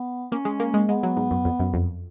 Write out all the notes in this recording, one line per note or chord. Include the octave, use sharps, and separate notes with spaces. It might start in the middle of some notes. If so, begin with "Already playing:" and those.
Already playing: B3
A#3 C#4
G#3
A#3
G#3
G#3 B3
F#3
G#2
F#2
F2
F#2
F2